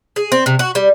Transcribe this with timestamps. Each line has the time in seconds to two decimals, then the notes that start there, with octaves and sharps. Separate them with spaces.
0.16 G#4
0.32 C4
0.46 C3
0.59 F#4
0.75 G3